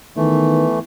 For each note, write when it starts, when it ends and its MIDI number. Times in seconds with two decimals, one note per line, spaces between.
0.17 0.67 51
0.17 0.79 52
0.17 0.79 57
0.17 0.81 59
0.17 0.81 64